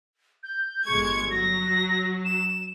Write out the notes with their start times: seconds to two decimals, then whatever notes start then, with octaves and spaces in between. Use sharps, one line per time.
0.43 G6
0.86 G1 G#3 C#6 G#6
1.31 F#3 A#6
2.25 E7